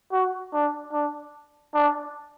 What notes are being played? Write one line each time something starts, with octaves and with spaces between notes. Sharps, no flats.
F#4
D4
D4
D4